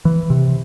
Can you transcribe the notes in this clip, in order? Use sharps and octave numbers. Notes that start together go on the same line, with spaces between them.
E3
C3